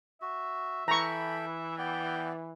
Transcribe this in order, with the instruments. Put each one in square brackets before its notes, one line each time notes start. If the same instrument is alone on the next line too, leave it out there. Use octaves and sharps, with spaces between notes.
[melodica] F#4 [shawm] E5
[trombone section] E3 [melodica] A4 G5 B5 [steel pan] A#5 C#6
[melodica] B3 D5 [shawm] G5